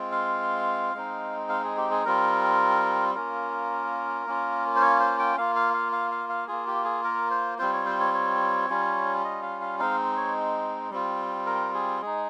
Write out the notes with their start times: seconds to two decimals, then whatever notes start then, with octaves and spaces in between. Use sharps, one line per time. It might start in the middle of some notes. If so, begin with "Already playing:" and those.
Already playing: G#3 C4 F4
0.12 F5
0.94 G#3 C4 D#4
1.49 F5
1.64 G#4
1.77 G4
1.91 G#4
2.05 G3 C4 F4 A#4
3.15 A#3 C#4 F4 A#4
4.26 A#3 C#4 F4
4.76 C5
4.81 C#5
5.00 C5
5.19 G5
5.37 A#3 F4 F5
5.56 F5
5.74 F5
5.92 F5
6.11 F5
6.29 F5
6.48 A#3 F4 G#4
6.67 G4
6.84 G#4
7.04 A#4
7.31 C5
7.58 G3 C4 F4 C5
7.73 C#5
7.86 C5
8.00 C#5
8.14 C#5
8.70 G3 C#4 F4
9.24 D#5
9.43 F5
9.61 F5
9.79 G#3 C4 D#4 F5
10.17 C#5
10.91 G3 C4 F4
11.46 A#4
11.74 G#4
12.02 G#3 D#4 G#4